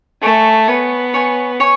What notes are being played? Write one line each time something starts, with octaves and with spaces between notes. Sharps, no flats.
A3 C#5 G#5 C#6
B3 C#5 G#5 C#6
C#5 G#5 C#6
C#5 G#5 C#6